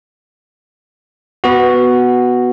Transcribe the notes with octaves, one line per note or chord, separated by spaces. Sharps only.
B3 F#4